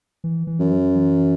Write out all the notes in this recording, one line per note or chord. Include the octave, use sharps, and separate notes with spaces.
E3
E3
F#2
F#3
E3